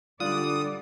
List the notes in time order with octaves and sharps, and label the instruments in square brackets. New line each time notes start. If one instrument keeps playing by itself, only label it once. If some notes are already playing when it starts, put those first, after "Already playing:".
[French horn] D3 [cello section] G3 D5 [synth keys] F4 F#6 [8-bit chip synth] D#6